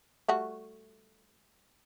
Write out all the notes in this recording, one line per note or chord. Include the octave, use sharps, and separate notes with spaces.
G3 A3 F#4